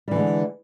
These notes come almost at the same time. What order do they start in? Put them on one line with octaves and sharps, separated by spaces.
G3 E3 D3 G#3